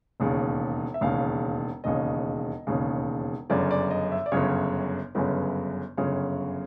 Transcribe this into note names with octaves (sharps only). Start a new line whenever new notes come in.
E1 D#2 C#3
E5
E1 D#2 C#3 F5
E1 D#2 C#3 D#5
E1 D#2 C#3
G1 F#2 C#3 D5
D5
D#5
E5
D5
G1 F#2 C#3 C#5
G1 F#2 C#3 B4
G1 F#2 C#3 C#5